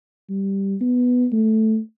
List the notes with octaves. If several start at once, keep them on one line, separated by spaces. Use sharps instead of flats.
G3
B3
A3